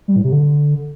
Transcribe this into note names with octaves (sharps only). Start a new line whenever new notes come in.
G3
A2
C3
D3